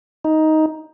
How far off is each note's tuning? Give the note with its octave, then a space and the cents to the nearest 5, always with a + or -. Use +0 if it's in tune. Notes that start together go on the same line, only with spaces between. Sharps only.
D#4 +10